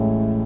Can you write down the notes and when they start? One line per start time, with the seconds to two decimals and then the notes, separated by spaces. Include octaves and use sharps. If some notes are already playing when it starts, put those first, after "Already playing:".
Already playing: A1 A2 G#3